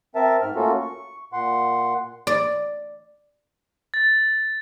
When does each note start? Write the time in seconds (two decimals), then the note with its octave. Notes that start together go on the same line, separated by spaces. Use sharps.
0.15 C4 A#4 E5 A5
0.42 G#2 F6
0.55 A3 A#3 C#4 F4 F#4 A4
0.81 C#6
1.33 A#2 F#5 C6
2.27 D5
3.94 A6